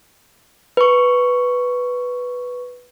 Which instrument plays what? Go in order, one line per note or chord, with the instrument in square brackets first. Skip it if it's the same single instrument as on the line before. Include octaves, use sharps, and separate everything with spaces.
[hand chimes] B4 C#6